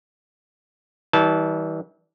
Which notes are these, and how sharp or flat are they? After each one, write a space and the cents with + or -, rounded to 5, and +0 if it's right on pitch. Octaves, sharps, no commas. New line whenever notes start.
E3 -40 G3 -15 A5 -20